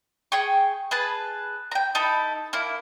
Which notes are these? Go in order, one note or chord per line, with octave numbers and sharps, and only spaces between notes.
G#4 G5 C#6
G#4 B4 A5
G5 A#5
D#4 E4 A4 B5
A#3 E4